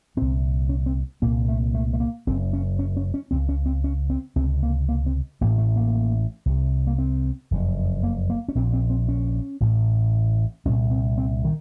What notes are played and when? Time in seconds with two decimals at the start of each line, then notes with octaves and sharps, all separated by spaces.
0.17 C2 A#2 C4
0.69 C#4
0.86 C4
1.22 C2 A#2 A#3
1.48 A3
1.74 A3
1.93 A3
2.00 A#3
2.27 F#1 F#2 C#3 C4
2.53 C#4
2.79 C#4
2.97 C#4
3.14 C#4
3.31 C#2 C#3 C4
3.49 C#4
3.66 C4
3.84 C#4
4.10 C4
4.36 C#2 C3 C4
4.63 A#3
4.89 A#3
5.06 C4
5.41 A1 A2 A#3
5.58 A3
5.76 A#3
6.46 C2 C3
6.87 A#3
6.98 C4
7.51 F#1 F2 C#3
8.03 A#3
8.30 A#3
8.48 C#4
8.55 A#1 A#2 C4
8.73 C4
8.90 C4
9.08 C#4
9.60 A1 A2
10.65 C2 C#4
10.69 A#2
10.91 C4
11.18 C4
11.44 D#3